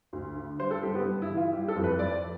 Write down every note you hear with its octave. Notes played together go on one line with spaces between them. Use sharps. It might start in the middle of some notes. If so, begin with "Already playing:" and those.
D2
D3
G3 C5
A4
G2 G4
B3
G2
E4
E3
F4
G3 G4
A4
F2
B4
F2 D5